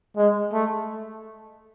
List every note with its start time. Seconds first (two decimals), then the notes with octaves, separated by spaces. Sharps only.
0.17 G#3
0.53 A3